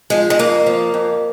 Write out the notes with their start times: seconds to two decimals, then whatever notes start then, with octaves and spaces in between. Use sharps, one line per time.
0.10 F3 G#3
0.30 G#3
0.39 F2 A#3
0.66 F3
0.94 F2